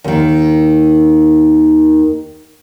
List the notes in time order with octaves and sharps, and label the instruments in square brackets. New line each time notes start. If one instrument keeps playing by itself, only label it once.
[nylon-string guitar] D#2 D#3